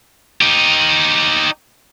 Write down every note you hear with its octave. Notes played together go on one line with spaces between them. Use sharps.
D#4 G4